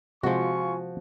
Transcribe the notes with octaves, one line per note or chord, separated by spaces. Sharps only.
C3 F3 G#3 F4 F#4 G#5 C#6